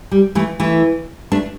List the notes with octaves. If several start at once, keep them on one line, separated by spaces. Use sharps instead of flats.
G3
E3 A3
E3 A3
A3 D4